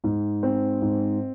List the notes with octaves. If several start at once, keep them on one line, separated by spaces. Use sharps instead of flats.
G#2
C4
G#2